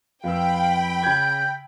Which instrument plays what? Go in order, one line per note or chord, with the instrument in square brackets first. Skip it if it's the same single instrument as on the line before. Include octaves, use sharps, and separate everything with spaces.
[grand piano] F2 B4 E6 [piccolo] F5 [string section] G5 B5
[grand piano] C#3 G#6 [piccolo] G6